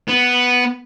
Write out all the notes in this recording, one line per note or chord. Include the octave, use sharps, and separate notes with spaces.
B3